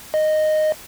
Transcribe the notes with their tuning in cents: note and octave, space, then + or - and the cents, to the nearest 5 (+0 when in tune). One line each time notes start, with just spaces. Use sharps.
D#5 -10